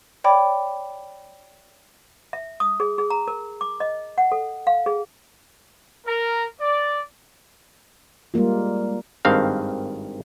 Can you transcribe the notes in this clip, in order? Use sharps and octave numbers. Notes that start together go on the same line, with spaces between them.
C#5 D5 G5 B5 D6
E5
D#6
G#4
G#4
A#5
A#4
D6
D#5
F#5
A4
F5
G#4
A#4
D5
G3 G#3 A#3 F4
G#1 G2 D#3 C4 F5